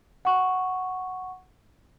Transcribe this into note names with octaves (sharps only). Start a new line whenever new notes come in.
F#5 C#6